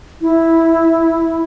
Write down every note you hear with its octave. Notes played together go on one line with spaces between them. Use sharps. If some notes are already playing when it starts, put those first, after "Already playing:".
E4